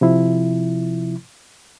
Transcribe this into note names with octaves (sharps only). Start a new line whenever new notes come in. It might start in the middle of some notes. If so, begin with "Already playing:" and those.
C3 F3 E4